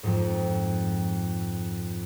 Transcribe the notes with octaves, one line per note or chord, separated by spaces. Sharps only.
F2 G#2